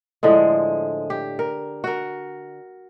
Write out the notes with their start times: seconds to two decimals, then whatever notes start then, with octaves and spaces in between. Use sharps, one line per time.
0.23 A2 D3 F3 G#3
1.10 G4
1.39 A#4
1.84 F#4 A#4